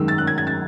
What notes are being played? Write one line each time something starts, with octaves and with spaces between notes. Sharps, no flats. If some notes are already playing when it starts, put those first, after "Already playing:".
Already playing: F#2 D#3 G#3 E6
A6
F#6
G#6
G#6
A6